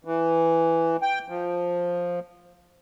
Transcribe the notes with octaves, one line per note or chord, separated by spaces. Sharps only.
E3
G5
F3